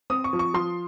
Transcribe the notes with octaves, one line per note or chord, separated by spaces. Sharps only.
C4 D#6
C#6
F3
C#6
F3 C6